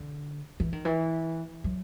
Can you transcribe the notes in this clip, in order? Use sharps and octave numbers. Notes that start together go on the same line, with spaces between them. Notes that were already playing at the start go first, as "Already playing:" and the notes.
Already playing: D3
E3
D#3
E3
F#3